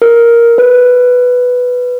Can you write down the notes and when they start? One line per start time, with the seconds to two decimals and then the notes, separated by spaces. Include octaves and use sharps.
0.02 A#4
0.58 B4